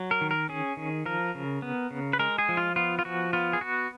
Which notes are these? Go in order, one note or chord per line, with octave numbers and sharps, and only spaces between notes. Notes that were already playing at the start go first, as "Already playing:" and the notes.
Already playing: F#3
A#4
D#3
A#4
C#4 G#4
D#3
F3 A#4
C#3
B3
C#3
B4
G#3 A#4
G#4
F3
F4
B3 F4
F4
F3 F#4
B3 F4
G#4
B3 F#4